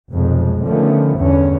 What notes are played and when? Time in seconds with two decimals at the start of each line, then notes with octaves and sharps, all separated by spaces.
0.11 F1 B1 F2 G#3
0.65 D3 D#3 F3 A3 B3 C#4
1.17 E2 G2 D3 C#4